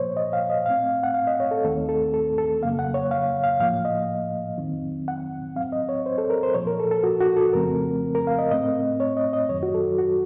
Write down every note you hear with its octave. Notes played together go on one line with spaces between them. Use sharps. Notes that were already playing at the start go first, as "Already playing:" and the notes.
Already playing: A#2 F3 A#3 C5 C#5
D#5
F5
D#5
A2 A3 C4 F5
F#5
F5
D#5
C#5
A4
D#2 D#3 A3 C4 A4
A4
A4
A4
F2 C#3 F#3 A#3 F5
F#5
C#5
F5
F5
A2 F3 A#3 F5
D#5
F2 D#3 F#3 C4
F#5
A2 F#3 C4 F5
D#5
C#5
C5
A4
A#4
C5
A#2 F3 A#3 C#5
A#4
A4
A4
F#4
F#4
A4
F2 C#3 F3 A3 C4 A#4
A#4
F5
D#5
A2 A3 C4 D#5
C#5
D#5
D#5
F#2 D#3 F#3 C#5
F#4
A4
F#4